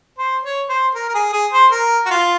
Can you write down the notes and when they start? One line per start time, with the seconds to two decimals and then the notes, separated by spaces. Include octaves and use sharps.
0.18 C5
0.43 C#5
0.69 C5
0.95 A#4
1.09 A#4
1.14 G#4
1.33 G#4
1.52 C5
1.71 A#4
2.06 F#4
2.11 F4